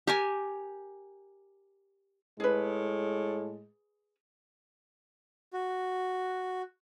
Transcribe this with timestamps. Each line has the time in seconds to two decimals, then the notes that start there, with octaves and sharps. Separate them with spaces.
0.07 G4 A#4 G#5
2.40 A2 G#3 G#4 B4
5.53 F#4